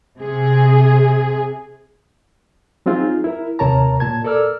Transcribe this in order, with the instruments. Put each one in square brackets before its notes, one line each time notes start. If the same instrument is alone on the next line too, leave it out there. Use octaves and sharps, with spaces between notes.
[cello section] C3 G#4
[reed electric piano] F#3 C4 D#4 F4 G#4
E4 A#4
D#2 C3 A#4 C#5 A5 A#5
A#2 A5 G#6
A4 A#4 D5 E6 F6